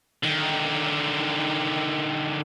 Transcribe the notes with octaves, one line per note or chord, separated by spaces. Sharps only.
D3 D#3